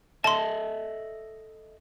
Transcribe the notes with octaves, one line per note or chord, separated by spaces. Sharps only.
A4 D#5 E5 A5 C6